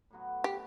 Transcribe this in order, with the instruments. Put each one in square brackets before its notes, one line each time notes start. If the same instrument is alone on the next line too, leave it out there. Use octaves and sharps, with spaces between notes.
[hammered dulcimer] A2 F#3 B3 F#4
[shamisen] G4